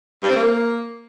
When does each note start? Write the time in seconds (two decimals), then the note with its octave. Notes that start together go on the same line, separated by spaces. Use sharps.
0.23 G2
0.29 C4
0.35 A#3